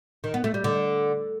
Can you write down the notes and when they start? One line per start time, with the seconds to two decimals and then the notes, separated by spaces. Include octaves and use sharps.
0.24 D#3
0.34 B3
0.44 A3
0.54 G3
0.64 D3